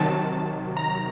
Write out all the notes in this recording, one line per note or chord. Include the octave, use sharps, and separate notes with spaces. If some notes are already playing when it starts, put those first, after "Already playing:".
Already playing: C3 D#3 F#3 A5
A#5